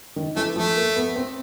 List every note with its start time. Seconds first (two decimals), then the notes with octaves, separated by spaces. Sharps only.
0.16 D#3
0.36 E3 A3
0.56 F3 A3
0.76 A#3
0.96 B3
1.16 C4